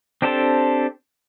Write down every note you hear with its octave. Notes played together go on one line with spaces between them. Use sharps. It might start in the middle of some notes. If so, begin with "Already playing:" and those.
C4 D4 G4 A4 C5